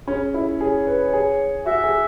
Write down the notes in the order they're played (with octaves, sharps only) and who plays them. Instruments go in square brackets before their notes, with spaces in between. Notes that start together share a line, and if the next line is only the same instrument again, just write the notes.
[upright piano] C#4 [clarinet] G#4
[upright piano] E4
[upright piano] G#4 [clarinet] C#5
[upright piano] B4
G#4
[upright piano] F#4 [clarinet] E5
[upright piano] G#4